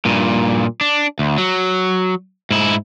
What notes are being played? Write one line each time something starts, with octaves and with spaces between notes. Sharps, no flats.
G2 A#2
D4
D2
F#3
G#2 E4